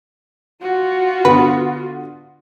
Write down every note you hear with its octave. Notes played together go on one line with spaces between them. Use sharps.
F4 F#4
D3 B3 B4